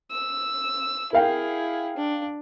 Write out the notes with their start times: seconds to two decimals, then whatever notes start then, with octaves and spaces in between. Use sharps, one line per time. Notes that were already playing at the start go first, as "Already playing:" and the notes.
0.12 E6
1.13 E4 G#4 A#4 F5 G5
1.97 D4